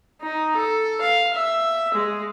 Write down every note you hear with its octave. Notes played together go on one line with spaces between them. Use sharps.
D#4
A4
F5
E5
G#3